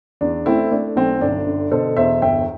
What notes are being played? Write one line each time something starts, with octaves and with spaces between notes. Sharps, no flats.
E2 D4
A3 C4 E4
A3 D4
B1 C4
G1 D4
D3
B2 A4 C5
E2 C5 E5
G1 E5 G5